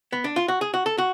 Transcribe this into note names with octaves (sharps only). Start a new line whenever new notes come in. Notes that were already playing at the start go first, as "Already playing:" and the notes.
B3
D4
F4
F#4
G#4
F#4
A4
F#4